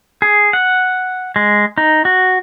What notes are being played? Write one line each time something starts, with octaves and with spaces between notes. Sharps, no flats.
G#4
F#5
G#3
D#4
F#4